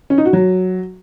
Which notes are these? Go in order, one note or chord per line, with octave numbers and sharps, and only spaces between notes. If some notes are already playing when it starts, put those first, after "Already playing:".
C#4
D#4
F#4
F#3